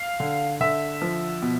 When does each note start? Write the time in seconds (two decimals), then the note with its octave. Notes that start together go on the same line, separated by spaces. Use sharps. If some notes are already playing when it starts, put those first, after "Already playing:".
Already playing: F5
0.20 D3
0.60 D3 E5
1.02 F3
1.42 B2